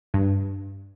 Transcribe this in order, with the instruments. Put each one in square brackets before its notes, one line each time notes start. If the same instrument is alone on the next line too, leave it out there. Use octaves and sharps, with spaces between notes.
[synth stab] G2